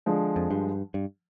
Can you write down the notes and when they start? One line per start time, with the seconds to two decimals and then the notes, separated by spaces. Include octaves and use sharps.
0.06 D3 F3 G#3
0.36 F2
0.51 G2
0.94 G2